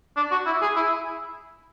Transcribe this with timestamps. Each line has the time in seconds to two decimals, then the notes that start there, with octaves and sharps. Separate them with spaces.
0.17 D4
0.31 F#4
0.46 E4
0.62 G#4
0.76 E4